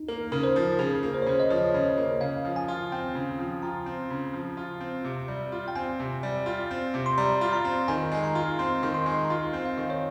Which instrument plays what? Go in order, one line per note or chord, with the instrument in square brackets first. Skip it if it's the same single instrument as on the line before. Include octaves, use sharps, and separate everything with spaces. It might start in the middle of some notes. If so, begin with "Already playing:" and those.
Already playing: [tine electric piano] D#4
[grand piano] A#3 [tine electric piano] A#4
[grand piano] C#3 [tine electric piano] A#4
[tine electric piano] C5
[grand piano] F3
[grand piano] C#3 [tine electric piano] G#4
[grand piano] A#3
[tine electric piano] C5
C#5
[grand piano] C#3 [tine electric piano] C5
[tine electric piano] D#5
[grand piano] F3 [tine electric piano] C#5
[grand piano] C#3
A#3
[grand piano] C#3 [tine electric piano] F5
[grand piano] F3
[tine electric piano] G#5
[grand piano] F4
[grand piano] C4 [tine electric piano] G5
[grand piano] C#3
F3
[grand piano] F4 [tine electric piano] A#5
[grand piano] C4
C#3
F3
F4
C4
C3
G3
F4
[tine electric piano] G5
[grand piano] C4 [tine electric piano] G#5
[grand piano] C3
G3
F4
C4
C3
[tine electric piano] C6
[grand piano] G3 [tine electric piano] A#5
[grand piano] F4
[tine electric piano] A#5
[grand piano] C4
[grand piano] D#3 [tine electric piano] G#5
[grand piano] G#3 [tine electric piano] G#5
[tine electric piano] A#5
[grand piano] F4
[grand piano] C4 [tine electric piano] C6
[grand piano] D#3
[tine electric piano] C6
[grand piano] G#3
[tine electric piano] A#5
[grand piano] F4 [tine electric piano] G#5
[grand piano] C4
[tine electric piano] F5
[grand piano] D#3
[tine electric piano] C#5